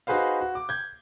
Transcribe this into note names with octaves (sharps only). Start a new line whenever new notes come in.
D#4 F#4 G#4 B4 C5 F5
F#4
D6
G6 G#6